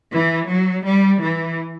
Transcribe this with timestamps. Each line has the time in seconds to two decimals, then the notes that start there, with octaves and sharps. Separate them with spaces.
0.13 E3
0.49 F#3
0.85 G3
1.22 E3